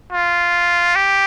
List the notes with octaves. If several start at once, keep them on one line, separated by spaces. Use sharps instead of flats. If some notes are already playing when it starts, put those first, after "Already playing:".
F4
G4